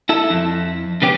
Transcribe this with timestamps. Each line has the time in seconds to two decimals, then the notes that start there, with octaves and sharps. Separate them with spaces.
0.09 E4 A4 E5
0.30 F2
1.02 C#3 B3 C#4 G4